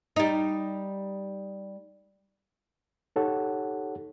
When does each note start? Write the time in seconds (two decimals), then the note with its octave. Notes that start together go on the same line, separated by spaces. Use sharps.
0.16 G3 D#4
3.16 D#4 G4 A4 C#5 F#5